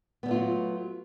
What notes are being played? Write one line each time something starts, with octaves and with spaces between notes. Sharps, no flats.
F#3 G3 A3 B3 F4